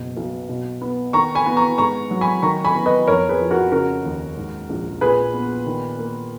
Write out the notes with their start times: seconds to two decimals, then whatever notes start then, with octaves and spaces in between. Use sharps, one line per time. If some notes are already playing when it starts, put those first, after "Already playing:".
Already playing: F#1 B2
0.17 B1
0.49 B2
0.81 B3
1.13 D#3 A#5 C#6
1.35 G#5 B5
1.46 B3
1.57 A#5 C#6
1.78 G#2 A#5 C#6
2.11 F#3
2.21 G#5 B5
2.42 D#3 A#5 C#6
2.64 G#5 B5
2.75 B3
2.86 B4 D#5
3.07 F2 A#4 C#5
3.29 G#4 B4
3.40 F3
3.51 F#4 A#4
3.72 C#3 F#4 A#4
4.05 D#2
4.37 G#2
4.69 A#1
5.01 A#2 G#4 B4
5.34 B3
5.66 D#3
5.99 A#3